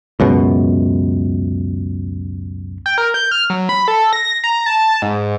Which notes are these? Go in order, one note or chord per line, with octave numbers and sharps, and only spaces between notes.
C#2 F#2 B2
G5
A#4
G6
F6
F#3
B5
A4
A#6
A#5
A5
G#2